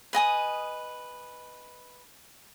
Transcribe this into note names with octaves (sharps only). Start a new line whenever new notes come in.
B4 D#5 G#5 D#6